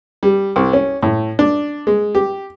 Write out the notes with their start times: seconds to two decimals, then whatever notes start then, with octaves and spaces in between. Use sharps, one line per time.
0.23 G3
0.56 C2
0.73 C#4
1.03 A2
1.39 D4
1.87 G#3
2.15 G4